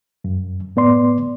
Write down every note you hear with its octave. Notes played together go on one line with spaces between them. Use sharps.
F#2
A2 B3 D5 C6